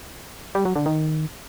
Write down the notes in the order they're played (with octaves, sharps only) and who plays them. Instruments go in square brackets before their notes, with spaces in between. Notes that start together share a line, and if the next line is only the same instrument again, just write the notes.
[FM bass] G3
F#3
D3
D#3